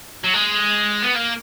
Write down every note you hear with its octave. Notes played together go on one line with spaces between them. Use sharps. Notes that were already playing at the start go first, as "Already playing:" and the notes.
F#3
G#3
B3
A#3